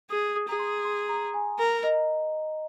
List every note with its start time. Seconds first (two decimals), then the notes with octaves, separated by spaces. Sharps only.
0.10 G#4 D#6
0.36 D#6
0.48 G#4 A#5
0.59 C6
0.85 C6
1.09 A#5
1.34 G#5
1.58 A#4 A#5
1.83 D#5